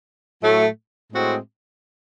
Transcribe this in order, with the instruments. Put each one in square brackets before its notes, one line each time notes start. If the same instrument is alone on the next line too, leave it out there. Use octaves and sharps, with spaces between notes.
[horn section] A2 F#3 A3
A2 G#3 C4 F#4